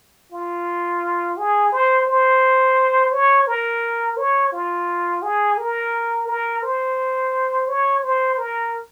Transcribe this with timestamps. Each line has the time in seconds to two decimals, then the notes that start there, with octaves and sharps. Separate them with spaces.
0.32 F4
1.38 G#4
1.72 C5
2.07 C5
3.13 C#5
3.48 A#4
4.17 C#5
4.52 F4
5.23 G#4
5.58 A#4
6.28 A#4
6.63 C5
7.68 C#5
8.03 C5
8.38 A#4